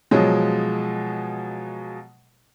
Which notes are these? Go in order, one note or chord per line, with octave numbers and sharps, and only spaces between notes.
B2 F3 F#3 G#3